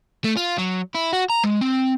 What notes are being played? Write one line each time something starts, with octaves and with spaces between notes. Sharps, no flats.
A3
F4
F#3
E4
F#4
A#5
G#3
C4